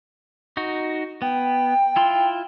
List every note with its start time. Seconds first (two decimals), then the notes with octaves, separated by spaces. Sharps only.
0.57 D#4 F#4
1.22 B3 G5
1.96 E4 F4 C6